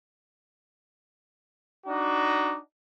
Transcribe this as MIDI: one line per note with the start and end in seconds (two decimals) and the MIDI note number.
1.86 2.56 62
1.86 2.56 63
1.86 2.56 66